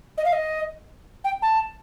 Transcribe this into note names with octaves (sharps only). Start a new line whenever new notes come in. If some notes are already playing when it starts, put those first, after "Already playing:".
D#5
F5
D#5
G5
A5